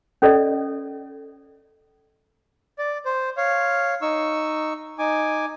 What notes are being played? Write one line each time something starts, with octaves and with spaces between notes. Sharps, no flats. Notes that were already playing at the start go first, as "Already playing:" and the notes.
C#4 A4 D5 D#5
D5
C5
C#5 F5
D#4 C#6 E6
D#4 G#5 D6